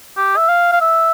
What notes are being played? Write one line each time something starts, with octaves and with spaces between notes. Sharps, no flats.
G4
E5
F5
F5
E5